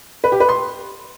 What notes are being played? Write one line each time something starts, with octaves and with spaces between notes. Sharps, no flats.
B4
G4
B4
C6